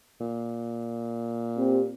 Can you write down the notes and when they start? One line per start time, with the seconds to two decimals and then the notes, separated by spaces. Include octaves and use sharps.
0.21 A#2
1.57 C4 G4